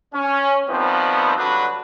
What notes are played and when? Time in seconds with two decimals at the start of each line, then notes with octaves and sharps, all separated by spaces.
0.14 C#4
0.68 D#3 F3 G3 B3 C4
1.37 G2 D3 F#3 D4 F#4 B4